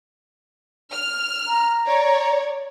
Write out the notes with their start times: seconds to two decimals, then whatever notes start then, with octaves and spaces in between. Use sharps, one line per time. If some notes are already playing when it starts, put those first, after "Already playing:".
0.91 F6
1.47 A#5
1.87 C#5 D5